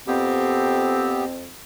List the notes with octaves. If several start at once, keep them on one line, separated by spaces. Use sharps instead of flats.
F2 B3 C4 G4